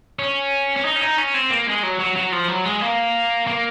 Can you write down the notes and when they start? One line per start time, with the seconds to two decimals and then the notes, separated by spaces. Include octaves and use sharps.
0.19 C#4
0.76 C#4
0.85 D#4
0.96 C#4
1.01 D#4
1.17 C#4
1.34 C4
1.50 A#3
1.67 G#3
1.83 F#3
2.00 F#3
2.16 F#3
2.33 F3
2.48 F#3
2.65 G#3
2.82 A#3
3.47 A#3